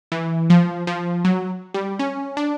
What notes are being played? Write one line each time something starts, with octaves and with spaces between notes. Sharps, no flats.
E3
F3
F3
F#3
G3
C#4
D4